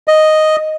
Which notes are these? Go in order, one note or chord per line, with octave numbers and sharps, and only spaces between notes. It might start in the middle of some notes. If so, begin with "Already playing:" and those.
D#5